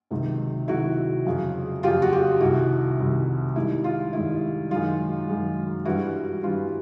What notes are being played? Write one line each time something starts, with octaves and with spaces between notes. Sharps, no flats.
C#2 C3 D#3 F#3
C#2 C3 D#3 F#3 E4 F#4
F2 C#3 F#3
F2 C#3 F#3 F4 G4
F#4
F4 G4
C2 C3 D#3 E4 F#4
C2 C3 D#3
G#2 D#3 G3 E4
F4
G#2 D#3 G3 E4
F#2 D#3 G#3 F4
F#2 D#3 G#3
G2 E3 G3 E4 F#4
G2 E3 G3 F4